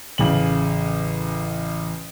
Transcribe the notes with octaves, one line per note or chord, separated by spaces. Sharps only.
A1 C#3 F#7